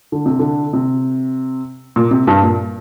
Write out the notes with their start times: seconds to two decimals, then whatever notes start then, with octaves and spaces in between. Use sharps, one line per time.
0.12 D3
0.26 C3
0.39 D3
0.73 C3
1.96 A#2
2.11 C3
2.27 G2
2.43 A#2